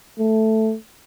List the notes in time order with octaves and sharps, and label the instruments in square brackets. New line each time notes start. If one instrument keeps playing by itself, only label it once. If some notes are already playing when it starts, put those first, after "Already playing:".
[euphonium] A3